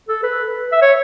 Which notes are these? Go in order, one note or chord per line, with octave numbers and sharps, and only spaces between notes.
A4
B4
E5
C#5